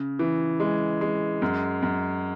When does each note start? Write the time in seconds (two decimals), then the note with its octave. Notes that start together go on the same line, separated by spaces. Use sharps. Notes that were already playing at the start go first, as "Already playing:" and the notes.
Already playing: C#3
0.19 E3
0.60 G#3
1.01 G#3
1.42 F#2
1.82 F#2